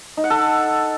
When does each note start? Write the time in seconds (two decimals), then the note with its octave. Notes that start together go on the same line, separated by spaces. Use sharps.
0.17 D#4
0.24 F#5
0.30 A4